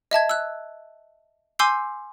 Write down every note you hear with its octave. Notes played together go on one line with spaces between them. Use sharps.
D#5 E5 A5 G#6
E6 F#6
G#5 C6 D6 E6 G6 C7